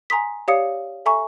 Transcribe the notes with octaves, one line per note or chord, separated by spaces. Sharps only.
G#5 A#5 C6 D#6 B6
G4 C#5 D5 F5 D#6 C#7
A4 E5 G#5 A#5 C#6